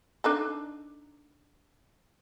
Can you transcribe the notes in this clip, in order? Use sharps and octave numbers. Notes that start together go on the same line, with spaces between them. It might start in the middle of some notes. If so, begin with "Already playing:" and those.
D4 D#4 A4